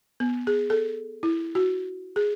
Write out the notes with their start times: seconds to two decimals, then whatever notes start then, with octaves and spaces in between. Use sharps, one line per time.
0.20 B3
0.47 G#4
0.70 A4
1.23 E4
1.55 F#4
2.16 G#4